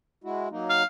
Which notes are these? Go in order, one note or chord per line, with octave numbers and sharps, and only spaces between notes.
G#3 E4 F#4
F#3 A#3 D#4
F5